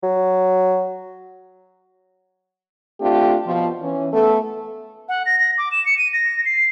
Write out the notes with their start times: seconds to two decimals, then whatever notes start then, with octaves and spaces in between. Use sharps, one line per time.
0.03 F#3
3.00 A3 C4 D4 F4 G4
3.45 B2 F3
3.81 E3 C#4
4.12 A3 B3 A4
5.09 F#5
5.26 A#6
5.40 A#6
5.58 D6
5.72 E7
5.86 C#7
5.98 D#7
6.13 A#6
6.45 C7